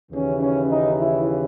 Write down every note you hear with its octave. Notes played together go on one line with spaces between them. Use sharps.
D#2 C#3 E3 C#4
C#4
D#4
E4